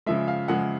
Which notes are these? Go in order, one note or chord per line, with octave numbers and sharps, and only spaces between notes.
C#3 F3 G#3 E5
F5
C#3 F3 G#3 F#5